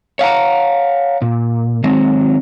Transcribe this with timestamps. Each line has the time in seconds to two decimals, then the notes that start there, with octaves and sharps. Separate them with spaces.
0.19 C#5 F5 F#5 A#5
1.22 A#2
1.84 D#3 F#3 G#3 C4